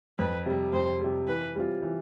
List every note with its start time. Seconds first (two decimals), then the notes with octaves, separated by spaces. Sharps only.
0.18 F2 B4
0.46 C3 G3
0.73 F2 C5
1.00 C3 G3
1.28 E3 B4
1.55 G3 C4 F4
1.82 E3